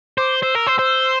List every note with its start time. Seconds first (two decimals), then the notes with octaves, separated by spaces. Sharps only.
0.18 C5 D6
0.42 C5 E6
0.55 A#4
0.67 C5
0.79 C5